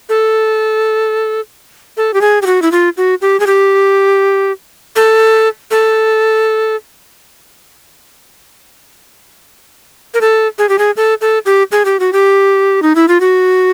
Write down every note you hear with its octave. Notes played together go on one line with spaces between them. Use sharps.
A4
A4
G4
G#4
G4
F#4
E4
F4
F#4
G4
G#4
G4
A4
A4
A#4
A4
G#4
G4
G#4
A4
A4
G4
G#4
G4
F#4
G4
D#4
E4
F4
F#4